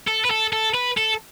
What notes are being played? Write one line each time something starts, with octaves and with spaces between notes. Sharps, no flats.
A4
B4
A4
A4
B4
A4